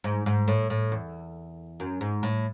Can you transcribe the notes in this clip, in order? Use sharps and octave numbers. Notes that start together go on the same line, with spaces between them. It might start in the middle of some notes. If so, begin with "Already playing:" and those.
G#2
G#2
A2
A2
E2
F#2
G#2
A2